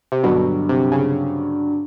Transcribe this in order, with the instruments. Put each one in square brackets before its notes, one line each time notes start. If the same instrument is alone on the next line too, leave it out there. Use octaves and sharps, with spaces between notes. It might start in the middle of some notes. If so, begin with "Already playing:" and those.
[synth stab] C3
[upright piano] G2 D3 F#3 [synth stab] B2
[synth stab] C3
C#3